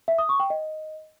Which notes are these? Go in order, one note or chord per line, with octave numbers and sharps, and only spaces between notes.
E5
D#6
C#6
G5
D#5